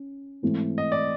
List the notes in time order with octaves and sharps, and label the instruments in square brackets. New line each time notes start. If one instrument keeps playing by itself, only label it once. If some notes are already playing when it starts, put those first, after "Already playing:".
Already playing: [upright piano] C#4
G#2 E3 A3 C4 E4
[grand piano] D#5
D5